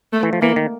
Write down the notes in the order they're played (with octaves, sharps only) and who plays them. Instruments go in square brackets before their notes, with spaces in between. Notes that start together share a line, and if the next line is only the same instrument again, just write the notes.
[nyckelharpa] A3
[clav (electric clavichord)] E3
F3
[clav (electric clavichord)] E3 [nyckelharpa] A#3
[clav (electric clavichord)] D#3